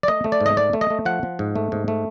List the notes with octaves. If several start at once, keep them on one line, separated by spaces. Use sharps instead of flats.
D5
A3 D#5
A3
D5
G#2
D#5
A3 D5
A3
D#5
A3
F3 F#5
F3
G#2
A3
G#2
A3